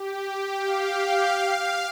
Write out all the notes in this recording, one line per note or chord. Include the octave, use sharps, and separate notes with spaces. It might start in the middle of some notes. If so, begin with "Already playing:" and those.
Already playing: G4
G4
F5
G5
F5